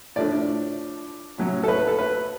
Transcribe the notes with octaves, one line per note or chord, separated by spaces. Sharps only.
A2 F3 A3 D4 D5
A2 F#3 C#4
A4
B4
A4
B4